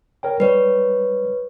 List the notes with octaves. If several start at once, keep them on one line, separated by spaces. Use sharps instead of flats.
A#4 C#5 G5
G3 B4 C#5